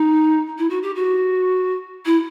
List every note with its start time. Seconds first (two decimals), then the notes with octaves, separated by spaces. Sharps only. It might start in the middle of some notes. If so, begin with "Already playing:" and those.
Already playing: D#4
0.58 E4
0.70 F#4
0.82 G4
0.95 F#4
2.05 E4